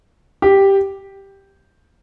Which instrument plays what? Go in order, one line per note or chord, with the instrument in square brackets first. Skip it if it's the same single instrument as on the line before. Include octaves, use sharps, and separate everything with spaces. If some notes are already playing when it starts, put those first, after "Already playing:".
[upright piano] G4